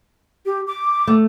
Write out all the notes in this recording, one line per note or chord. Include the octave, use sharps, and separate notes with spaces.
G4
D6
A3